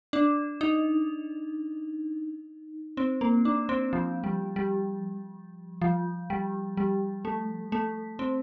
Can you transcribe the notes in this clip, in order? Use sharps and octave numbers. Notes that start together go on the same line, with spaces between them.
D4
D#4
C4
A#3
D4
C4
F3
G3
G3
F3
G3
G3
A3
A3
C4